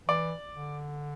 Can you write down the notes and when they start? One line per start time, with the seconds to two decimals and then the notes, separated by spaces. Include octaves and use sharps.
0.08 E3 D5
0.55 D3